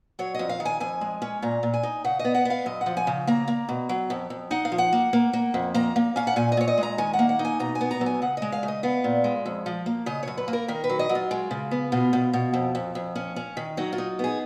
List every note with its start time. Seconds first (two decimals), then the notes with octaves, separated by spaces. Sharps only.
0.19 F#3 C#5
0.34 F2 D#5
0.49 F5
0.60 D#3
0.65 G#5
0.80 F2 G#5
1.01 G#3
1.22 C#4
1.42 A#2 A#5
1.63 A#2
1.73 G#5
1.83 D#4
2.04 C#3 F#5
2.19 D#5
2.25 B3
2.34 F#5
2.45 B3 F5
2.66 F#2 D#5
2.81 F#5
2.86 F3
2.97 G#5
3.07 C#3
3.27 A#3 A#5
3.48 A#3
3.69 B2
3.89 F#3
4.10 F2
4.30 F2
4.51 D#4 F#5
4.65 F5
4.72 F3
4.78 F#5
4.92 A#3
5.13 A#3
5.33 A#3
5.54 F2
5.74 A#3 A#5
5.96 A#3
6.16 C#4 F5
6.27 F#5
6.36 A#2 G#5
6.52 D#5
6.57 A#2 C#5
6.68 D#5
6.78 G#3
6.83 A#5
6.98 D#3 G#5
7.13 F#5
7.19 A#3
7.29 F#5
7.39 D#4
7.45 G#5
7.59 B2 A#5
7.75 G#5
7.81 B3
7.91 A#5
8.01 F#3
8.06 G#5
8.22 C#3 F#5
8.37 G#3 D#5
8.52 F5
8.63 C#3
8.68 D#5
8.83 B3 F5
9.04 A#2
9.24 G#3
9.46 F2
9.66 F3
9.86 A#3
10.06 C#3 D#5
10.23 F#2 C#5
10.37 B4
10.48 A#3
10.53 A#4
10.68 D#3 A#4
10.84 B4
10.89 F#3
10.99 D#5
11.09 F#3
11.15 F4
11.31 G#3
11.51 C#3
11.71 B3
11.92 B2 F4
12.13 B2
12.33 B2
12.54 F2
12.75 F2
12.95 F2
13.15 C#4
13.36 C#4
13.57 D#3
13.77 F#3 D#4
13.92 F4
13.98 D#4
14.19 B3 G#4